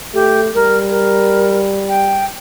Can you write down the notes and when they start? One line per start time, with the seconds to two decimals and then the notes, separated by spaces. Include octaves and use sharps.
0.14 A3 G4
0.55 G3 A#4
0.90 A#4
1.89 G5